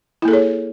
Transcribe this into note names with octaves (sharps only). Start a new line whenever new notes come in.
A#3 E4 G#4 A4 C#5